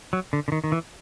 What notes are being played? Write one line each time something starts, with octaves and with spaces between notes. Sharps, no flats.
F#3
D3
D3
D#3
D#3
E3